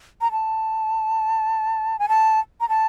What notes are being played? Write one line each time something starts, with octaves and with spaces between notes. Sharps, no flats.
A#5
A5
G#5
A5
A#5
A5